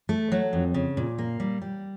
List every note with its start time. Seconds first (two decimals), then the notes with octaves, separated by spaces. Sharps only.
0.09 A3
0.32 F#3
0.53 F2
0.74 C#3
0.97 A#2
1.18 A#3
1.40 G3
1.61 G3